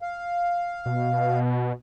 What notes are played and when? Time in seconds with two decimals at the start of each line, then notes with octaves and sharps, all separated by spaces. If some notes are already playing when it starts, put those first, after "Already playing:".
0.02 F5
0.86 B2